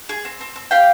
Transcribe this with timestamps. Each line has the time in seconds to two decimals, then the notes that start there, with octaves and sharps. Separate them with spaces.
0.09 G#4
0.25 C4
0.41 C4
0.56 C4
0.71 G4 F5 G5